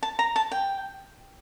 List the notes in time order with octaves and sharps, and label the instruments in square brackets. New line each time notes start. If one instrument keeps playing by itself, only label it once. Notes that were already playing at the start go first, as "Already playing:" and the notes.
[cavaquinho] A5
A#5
A5
G5